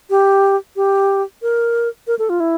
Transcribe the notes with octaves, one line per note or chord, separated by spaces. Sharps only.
G4
G4
A#4
A#4
A4
F4
E4